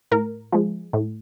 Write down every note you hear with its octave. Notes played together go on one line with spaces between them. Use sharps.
A2 A#4
F3 G#3
A2